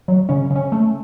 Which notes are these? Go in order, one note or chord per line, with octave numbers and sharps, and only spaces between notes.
F#3
C#3 C#4
C#3
C#4
A3